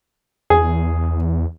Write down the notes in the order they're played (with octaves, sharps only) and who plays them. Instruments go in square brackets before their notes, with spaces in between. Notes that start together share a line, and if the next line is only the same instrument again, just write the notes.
[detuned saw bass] E2 [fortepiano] G#4